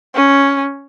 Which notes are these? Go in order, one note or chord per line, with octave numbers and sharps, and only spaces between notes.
C#4